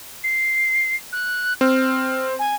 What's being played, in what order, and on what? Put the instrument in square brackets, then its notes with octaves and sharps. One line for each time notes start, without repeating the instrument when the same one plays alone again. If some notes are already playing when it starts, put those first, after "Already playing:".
[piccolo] C7
F#6
[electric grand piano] C4 [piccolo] F6
[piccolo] G#5